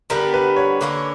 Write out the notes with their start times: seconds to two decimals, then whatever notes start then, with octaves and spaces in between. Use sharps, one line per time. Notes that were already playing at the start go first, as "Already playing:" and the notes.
0.10 D3 G3 B3 A#4
0.34 B4
0.56 C#5
0.81 D3 A#3 C#4